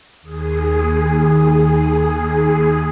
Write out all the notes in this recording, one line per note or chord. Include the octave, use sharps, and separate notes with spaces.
D#2 G#4